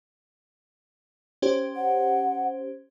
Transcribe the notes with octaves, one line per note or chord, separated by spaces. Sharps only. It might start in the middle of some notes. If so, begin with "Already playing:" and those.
C#4 G4 C5
F#5